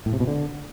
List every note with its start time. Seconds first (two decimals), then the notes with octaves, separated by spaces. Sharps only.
0.06 A2
0.13 C3
0.20 B2
0.27 D3